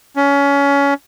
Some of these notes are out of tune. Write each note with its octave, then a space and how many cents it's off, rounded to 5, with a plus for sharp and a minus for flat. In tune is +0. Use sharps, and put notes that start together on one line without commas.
C#4 +25